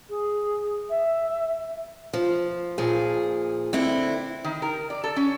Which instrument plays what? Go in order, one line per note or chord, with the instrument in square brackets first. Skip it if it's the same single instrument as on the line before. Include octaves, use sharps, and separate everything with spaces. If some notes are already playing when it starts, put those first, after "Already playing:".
[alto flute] G#4
E5
[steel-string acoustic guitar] F3
A#2 F3 G#4
D3 C4 E4
[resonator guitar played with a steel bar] D#3
A#4
D5
A4
C#4